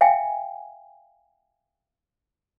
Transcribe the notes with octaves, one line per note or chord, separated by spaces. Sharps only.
E5 F5 G5 G#5